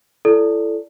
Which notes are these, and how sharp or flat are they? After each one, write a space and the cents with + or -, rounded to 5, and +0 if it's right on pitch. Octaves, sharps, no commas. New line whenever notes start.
E4 +30 A4 +0 D5 -15